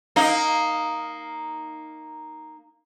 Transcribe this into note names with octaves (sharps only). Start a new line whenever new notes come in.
A#3 D#4